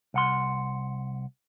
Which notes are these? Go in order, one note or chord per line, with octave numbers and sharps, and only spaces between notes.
C2 F#5 C6